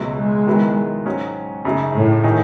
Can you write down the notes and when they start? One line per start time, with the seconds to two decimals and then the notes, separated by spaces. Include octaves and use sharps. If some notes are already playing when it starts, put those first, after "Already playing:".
Already playing: C#2 B2 F#3 A3
0.17 G#3
0.47 D#3 F#3 B3 E4
1.06 G#2 F#3 C#4 F#4
1.65 F#2 C#3 F#3 A3 D#4
1.94 A2
2.24 D#3 A3 D#4 G#4